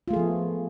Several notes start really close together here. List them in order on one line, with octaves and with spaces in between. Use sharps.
F4 A3 G#4 F3 B3